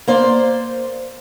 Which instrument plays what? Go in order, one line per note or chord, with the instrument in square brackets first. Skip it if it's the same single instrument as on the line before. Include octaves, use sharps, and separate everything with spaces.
[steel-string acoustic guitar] A#3 C5 D5